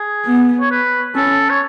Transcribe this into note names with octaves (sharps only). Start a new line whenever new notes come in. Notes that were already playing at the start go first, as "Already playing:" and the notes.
Already playing: G#4
B3
C#5
B4
C#4 A4
C#5